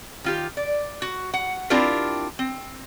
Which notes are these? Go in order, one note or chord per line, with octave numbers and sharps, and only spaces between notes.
D#3 F4 G4
D5
F#4
F#5
C4 D4 E4 F4 G4 A#4
C4